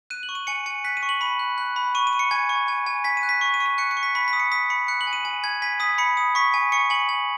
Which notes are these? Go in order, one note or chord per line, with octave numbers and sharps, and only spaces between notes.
F#6 D#7
F#7
C#6
D#7
G#5 C#7
G#5 C#7
F#6 B6
D#7
C#6
F#7
B5 D#7
F#6
F#6
B5
C#6 D#7
D#7
C#6
C#7
G#5 G#6
C#6
G#5
G#5
G#5 B6
D#7
F#6
B6
C#6
D#7
C#6
D#7
F#6 C#7
C#7
C#6
B6
B5 B6
B6
D#6
C#7
D#6 B6
B5 C#7
F#6 C#7
F#7
G#5
D#7
G#5 D#7
G#5 G#6
G#5 B6
D#6 B6
B5 C#7
D#6
C#6 B6
G#5
C#6 C#7
G#5 F#7
G#5